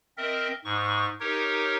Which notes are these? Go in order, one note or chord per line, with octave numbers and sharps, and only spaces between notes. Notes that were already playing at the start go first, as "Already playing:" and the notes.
C4 A#4 D#5 E5
G#2 C#6
D#4 G4 A#4 C#5